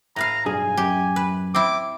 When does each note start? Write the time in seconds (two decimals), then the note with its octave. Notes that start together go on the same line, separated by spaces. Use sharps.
0.16 A2 B4 F5 A#5
0.46 B1 G2 G#4 G#5
0.77 F#2 G4
1.16 B4
1.55 C4 E4 D6